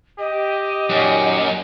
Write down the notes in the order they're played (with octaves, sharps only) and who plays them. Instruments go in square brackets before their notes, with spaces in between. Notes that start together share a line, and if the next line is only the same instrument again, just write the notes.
[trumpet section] G4 [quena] D#5
[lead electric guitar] F#2 [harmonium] A#2 D#3 F#3